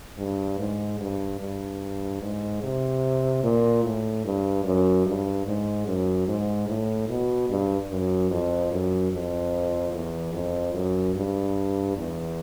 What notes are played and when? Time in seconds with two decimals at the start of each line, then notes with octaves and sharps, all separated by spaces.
0.18 G2
0.59 G#2
1.00 G2
1.40 G2
2.22 G#2
2.63 C3
3.43 A#2
3.84 A2
4.25 G2
4.65 F#2
5.06 G2
5.47 G#2
5.87 F#2
6.28 G#2
6.69 A2
7.09 B2
7.49 G2
7.90 F#2
8.30 F2
8.72 F#2
9.12 F2
9.93 E2
10.34 F2
10.74 F#2
11.15 G2
11.97 E2